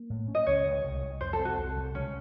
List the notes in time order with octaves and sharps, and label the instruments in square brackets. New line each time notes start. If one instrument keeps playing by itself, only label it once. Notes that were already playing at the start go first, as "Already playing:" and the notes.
Already playing: [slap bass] A#3
A2
C#4
[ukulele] D#5
[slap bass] C#2 [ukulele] C#5
[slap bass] C#2
C2
C2
[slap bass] F2 [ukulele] C5
[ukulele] A4
[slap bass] C4
[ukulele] F#4
[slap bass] C2
C2
[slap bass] C#2 [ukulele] C#4